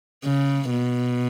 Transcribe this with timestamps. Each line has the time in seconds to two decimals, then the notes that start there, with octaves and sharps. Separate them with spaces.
0.25 C#3
0.71 B2